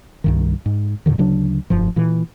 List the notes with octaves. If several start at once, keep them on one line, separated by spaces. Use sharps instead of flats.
C2 G2 D#3
G#2
F2 A#2 D3 D#3
D2 C#3 F#3 D4
F1 G2 F3
A#2 E3